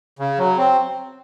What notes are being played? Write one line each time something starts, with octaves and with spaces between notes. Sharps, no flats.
C#3
F#3
C4